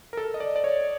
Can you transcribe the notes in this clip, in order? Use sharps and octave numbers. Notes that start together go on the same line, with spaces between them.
A#4
A4
D#5
D5
D5
C#5